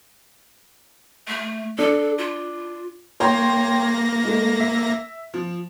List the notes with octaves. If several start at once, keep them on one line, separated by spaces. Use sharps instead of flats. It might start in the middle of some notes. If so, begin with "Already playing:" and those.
A3
D4 A4
F4
A#3 C#5 G5 C6 A#6
G#3 A3
E5
F3